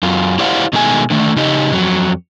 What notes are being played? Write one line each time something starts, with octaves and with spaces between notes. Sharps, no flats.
F#2 F4
E4 G4 C5 D5 F5 F#5
B2 D#3 G#3 A3 G#5
D3 D#3 A3
C#3 D#4 G4 D#5
F2 F#3